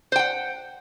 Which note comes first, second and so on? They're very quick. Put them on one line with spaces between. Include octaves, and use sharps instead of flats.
C5 G5 F#5